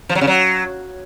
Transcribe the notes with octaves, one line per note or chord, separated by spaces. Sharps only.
F3
F#3
C#3
F#3